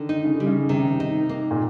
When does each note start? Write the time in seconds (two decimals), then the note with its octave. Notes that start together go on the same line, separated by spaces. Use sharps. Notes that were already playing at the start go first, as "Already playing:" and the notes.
Already playing: D3 D#3
0.09 D#4
0.24 C#3
0.36 D3 G3
0.47 C#3
0.69 C3 D#3
1.00 D#4
1.29 A#3
1.51 A#2